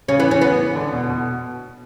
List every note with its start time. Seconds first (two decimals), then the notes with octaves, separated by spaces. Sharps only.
0.08 C#3 C#4
0.19 E3 B3
0.31 E3 C#4
0.42 B3
0.75 D3
0.92 B2
1.09 B2